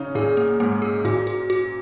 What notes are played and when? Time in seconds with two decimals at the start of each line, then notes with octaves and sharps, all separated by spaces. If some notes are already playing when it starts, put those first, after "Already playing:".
Already playing: C#3 C#4 D#4
0.15 A#2 G#4
0.37 A#3
0.60 G#2 A#3
0.82 G#4
1.04 A#2 F#4
1.27 F#4
1.50 F#4